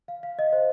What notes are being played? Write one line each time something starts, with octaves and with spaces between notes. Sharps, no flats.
F5
F5
D#5
C5